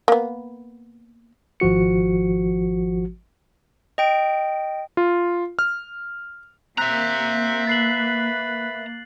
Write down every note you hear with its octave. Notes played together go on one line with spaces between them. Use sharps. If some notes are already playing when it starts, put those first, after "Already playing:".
A#3 B3
G#1 F3 F#4 C#7
D#5 G5 D7
F4
F6
A#3 C4 E5 A#5 F#6 B6
B4 A6 C7 F#7